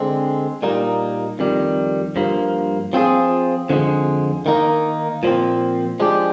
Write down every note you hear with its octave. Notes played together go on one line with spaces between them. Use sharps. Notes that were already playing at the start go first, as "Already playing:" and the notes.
Already playing: D3 G#3 C4
A#2 G3 A#3 D#4
F2 D#3 G3
G2 F3 A#3
F3 C4 F4 G#4
F2 D3 F3 G#3
D#3 A#3 D#4
A#2 F3 C4
F3 G#3 D4 G4